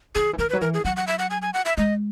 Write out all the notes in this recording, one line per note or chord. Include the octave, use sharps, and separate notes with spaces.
D#3 G#4
E3
D#3 A#4
B4
F#3
E3 A#4
G#4
F#3 F#5
F#5
E5
F#5
G#5
G#5
F#5
E5
G#3 D#5